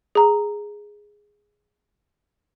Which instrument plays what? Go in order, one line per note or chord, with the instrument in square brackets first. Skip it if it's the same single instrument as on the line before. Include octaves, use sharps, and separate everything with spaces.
[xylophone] G#4 A#5